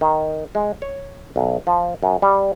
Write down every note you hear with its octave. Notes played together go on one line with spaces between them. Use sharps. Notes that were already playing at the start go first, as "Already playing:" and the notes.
D#3
G#3
C#5
B1
F3
F#2
G3